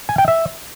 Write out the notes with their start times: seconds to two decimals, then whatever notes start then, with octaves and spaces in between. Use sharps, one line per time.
0.09 G#5
0.18 G5
0.28 E5